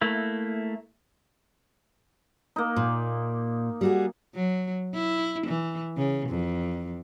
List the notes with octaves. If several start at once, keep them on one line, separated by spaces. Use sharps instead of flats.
A3 A#3 E4
A#3 D#4
A#2
G3 F#4 G#4
F#3
E4
E3
C#3
F2